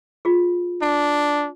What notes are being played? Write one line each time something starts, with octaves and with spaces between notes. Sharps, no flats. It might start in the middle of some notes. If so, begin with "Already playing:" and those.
F4 G#4
D4